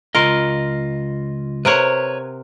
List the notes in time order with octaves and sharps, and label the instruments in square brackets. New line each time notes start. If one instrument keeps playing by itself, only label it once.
[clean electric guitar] C#2 F4 D#5 [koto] A#4
[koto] C3 A#4 F#5 [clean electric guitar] B4 C#5